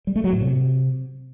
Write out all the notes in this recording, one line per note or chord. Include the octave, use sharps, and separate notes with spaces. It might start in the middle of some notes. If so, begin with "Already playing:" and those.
G3
A3
F#3
A2
C3